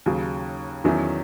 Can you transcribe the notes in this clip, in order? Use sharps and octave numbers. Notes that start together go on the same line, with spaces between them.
D#2 C#3 F#3
E2 D#3 F#3 C#4 E4